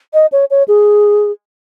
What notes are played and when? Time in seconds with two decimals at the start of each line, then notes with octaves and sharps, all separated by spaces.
0.14 D#5
0.32 C#5
0.51 C#5
0.68 G#4